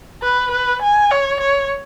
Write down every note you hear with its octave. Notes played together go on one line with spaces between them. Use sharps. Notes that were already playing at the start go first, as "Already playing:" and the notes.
B4
B4
G#5
C#5
C#5